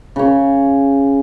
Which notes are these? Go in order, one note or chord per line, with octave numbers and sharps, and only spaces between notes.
C#3 C#5